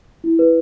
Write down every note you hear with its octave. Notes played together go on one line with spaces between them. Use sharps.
E4
B4